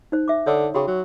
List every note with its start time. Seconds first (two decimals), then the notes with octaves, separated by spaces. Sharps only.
0.12 D#4 C5
0.28 E5 D6
0.47 D3 C#5 D#6 E6
0.74 C#3 F#4 G5 C#6
0.87 F#3